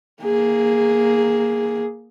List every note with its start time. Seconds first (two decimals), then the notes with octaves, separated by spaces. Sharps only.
0.23 A#3 G#4